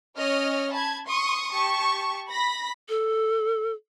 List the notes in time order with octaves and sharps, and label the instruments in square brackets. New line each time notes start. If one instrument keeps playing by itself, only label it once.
[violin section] C#4 C#5 D#5 F6
A5 B5 G#6
C6 C#6 D#6
G4 A5 C#6
B5 A#6 B6
[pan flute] A4